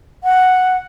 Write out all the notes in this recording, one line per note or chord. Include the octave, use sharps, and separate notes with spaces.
F#5